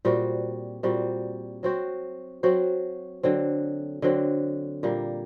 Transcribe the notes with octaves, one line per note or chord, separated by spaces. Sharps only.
A#2 G3 C4 F#4
A#2 G3 C4 F#4
F#3 C4 F#4 C5
F#3 C4 F#4 C5
D3 F#3 C4
D3 F#3 C4
A#2 G3 A#3